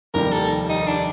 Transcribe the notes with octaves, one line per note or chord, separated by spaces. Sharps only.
F1 D#2 D#3 G3 A#4
A4
D#4
D4